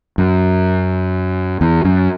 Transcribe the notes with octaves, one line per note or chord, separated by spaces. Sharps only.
F#2
E2
F#2